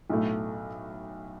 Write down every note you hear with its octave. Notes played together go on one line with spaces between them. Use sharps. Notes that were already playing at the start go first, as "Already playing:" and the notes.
B1 A2 A3